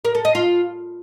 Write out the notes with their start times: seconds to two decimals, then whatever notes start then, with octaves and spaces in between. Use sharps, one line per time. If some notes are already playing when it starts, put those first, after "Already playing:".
0.05 A#4
0.15 A4
0.25 D#5
0.35 F4